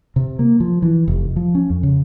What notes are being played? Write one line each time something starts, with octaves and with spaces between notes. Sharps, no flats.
C3
A#3
F3
E3
F1
F3
C#4
F2
C#3